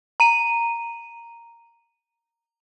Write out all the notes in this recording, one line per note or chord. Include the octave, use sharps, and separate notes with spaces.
A#5 D#7